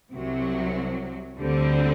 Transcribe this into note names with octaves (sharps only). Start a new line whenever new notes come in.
C2 C3 F#3
D2 D3 G3 C4